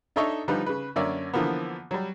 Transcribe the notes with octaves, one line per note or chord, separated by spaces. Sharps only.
D4 D#4 A4 C#5 D#5 E5
D3 F3 G3 D#4 F4 B4
C#3 B4
F#2 D3 A#3 C#4 D5 E5
D3 E3 F3 A#3 B3
F#3 G3